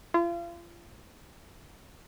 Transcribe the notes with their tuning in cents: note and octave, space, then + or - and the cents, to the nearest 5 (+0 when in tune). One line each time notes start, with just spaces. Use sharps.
F4 -35